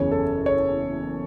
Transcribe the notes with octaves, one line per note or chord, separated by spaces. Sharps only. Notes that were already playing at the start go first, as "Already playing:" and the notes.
Already playing: F#1 E2 C#3 C#5
A4
C#5